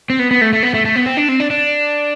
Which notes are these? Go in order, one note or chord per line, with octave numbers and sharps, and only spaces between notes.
C4
B3
B3
A3
A3
B3
A3
A3
B3
C4
D4
C4
D4
D4